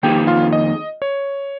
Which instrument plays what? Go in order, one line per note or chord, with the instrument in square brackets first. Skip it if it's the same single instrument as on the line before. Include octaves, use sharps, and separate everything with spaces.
[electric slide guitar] F2 D#3 A#3 D#4 G#4 [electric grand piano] G4 G5
[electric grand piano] F4 F5
D#5
C#5